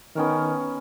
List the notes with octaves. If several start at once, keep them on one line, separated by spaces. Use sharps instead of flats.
D#3 B3 C#4 A#4